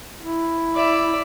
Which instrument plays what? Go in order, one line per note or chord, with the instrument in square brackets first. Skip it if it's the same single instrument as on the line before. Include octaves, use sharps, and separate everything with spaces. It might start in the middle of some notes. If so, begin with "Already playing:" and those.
[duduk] E4
[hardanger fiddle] D5 E5